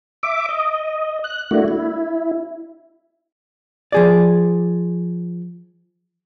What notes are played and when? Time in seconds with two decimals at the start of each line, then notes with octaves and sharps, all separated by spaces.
0.23 E5 D6
0.49 D#5
1.24 F#6
1.51 A3 A#3 D4 E4 F#4
1.68 E4
3.92 F3 G#4 D5